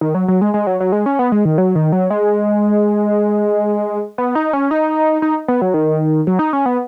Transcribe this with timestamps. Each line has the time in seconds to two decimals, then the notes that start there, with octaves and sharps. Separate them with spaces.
0.01 D#3
0.15 F#3
0.28 F#3
0.41 G#3
0.54 G#3
0.67 F#3
0.80 F#3
0.92 G#3
1.06 C#4
1.19 B3
1.32 G#3
1.45 D#3
1.58 F#3
1.75 D#3
1.92 F#3
2.10 G#3
4.18 B3
4.35 D#4
4.53 C#4
4.71 D#4
5.22 D#4
5.48 B3
5.62 F#3
5.74 D#3
6.27 F#3
6.39 D#4
6.53 C#4
6.66 B3